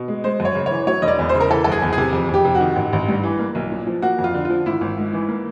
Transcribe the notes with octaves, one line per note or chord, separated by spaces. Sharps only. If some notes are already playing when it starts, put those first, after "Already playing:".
Already playing: B2
G#3
G#3 C5
F#2
C#5
C#3
C#5
E3
F#3 C#5
E1 D#5
D5
E2
C5
C#3
A#4
E3 A4
F#1 A4
G#4
E2
G#4
C3
F2
F2 G4
C3
F#4
D#3
A1
A1
G2
E3
A#3
B1
A#2
F3
A#3 F#4
F2
F4
D3
F3 F4
G#1 E4
G#1
G#2
E3
A#3